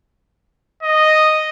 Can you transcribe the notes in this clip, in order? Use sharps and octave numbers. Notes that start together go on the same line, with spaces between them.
D#5